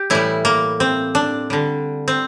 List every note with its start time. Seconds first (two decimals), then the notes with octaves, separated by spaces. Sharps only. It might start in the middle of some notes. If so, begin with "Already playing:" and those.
Already playing: G4
0.10 A2 E3 G3 E4
0.45 A#3
0.80 C4
1.15 D4
1.50 D3 G3
2.08 C4